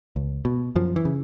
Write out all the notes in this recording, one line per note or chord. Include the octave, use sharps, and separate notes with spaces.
C#2
B2
F#2 F3
E3
C#3